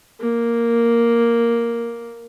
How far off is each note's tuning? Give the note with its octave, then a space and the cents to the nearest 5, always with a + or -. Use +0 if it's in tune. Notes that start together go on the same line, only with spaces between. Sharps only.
A#3 +0